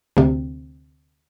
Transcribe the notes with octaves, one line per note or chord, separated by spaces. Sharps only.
D2 C3